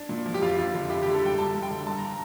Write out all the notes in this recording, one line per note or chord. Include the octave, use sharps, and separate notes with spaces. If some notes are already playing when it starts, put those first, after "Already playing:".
Already playing: D4
A#2
F3
G4
F2 F4
F2
D3
E4 G4
G4
D3
A4
G3 G5
G2 A5
G2
G5
D3
G2 A5
A#5